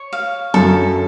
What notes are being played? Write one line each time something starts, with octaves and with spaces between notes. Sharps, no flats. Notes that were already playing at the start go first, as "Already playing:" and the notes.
Already playing: C#5
F5
F#2 F#3 A4